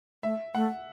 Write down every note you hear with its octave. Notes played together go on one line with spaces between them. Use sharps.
A3 E5
A3 F#5